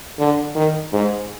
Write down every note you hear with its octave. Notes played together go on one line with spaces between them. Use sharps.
D3
D#3
G#2